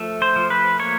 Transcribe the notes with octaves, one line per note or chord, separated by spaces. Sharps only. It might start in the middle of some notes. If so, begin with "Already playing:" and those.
Already playing: F3 A3
C5
F3
B4
A#3 C#5